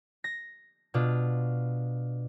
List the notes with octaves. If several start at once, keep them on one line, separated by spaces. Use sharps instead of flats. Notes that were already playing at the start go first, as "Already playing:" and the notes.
A#6
B2 D4 F4